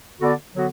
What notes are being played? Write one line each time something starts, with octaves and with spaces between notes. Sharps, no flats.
D3 B3 F#4 A4 D5
D3 F#3 B3 F#4